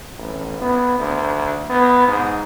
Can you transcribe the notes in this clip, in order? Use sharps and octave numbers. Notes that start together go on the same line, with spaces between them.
A1
B3
D2
B3
G#2